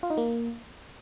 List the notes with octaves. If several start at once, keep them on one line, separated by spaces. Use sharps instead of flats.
F4
D#4
A#3